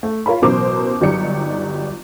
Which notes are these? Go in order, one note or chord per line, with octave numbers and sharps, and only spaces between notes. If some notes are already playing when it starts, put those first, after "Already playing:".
A3
F4 A#4 C#5 F5 B5
A1 B2 F#3 A#4 C5 D6
G1 F#3 D#4 G4 D5 C#7